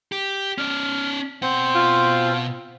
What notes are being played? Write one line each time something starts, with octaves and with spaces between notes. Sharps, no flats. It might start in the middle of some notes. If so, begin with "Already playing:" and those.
G4
C#4 D5 F6
B2 C4 C5 F#5
F4